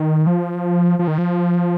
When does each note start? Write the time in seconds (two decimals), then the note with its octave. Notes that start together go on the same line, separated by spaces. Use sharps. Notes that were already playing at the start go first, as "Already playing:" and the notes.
Already playing: D#3
0.27 F3
0.99 F3
1.08 D#3
1.18 F3